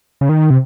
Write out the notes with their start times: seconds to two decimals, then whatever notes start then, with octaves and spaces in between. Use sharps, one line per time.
0.21 C#3
0.29 D#3
0.50 C3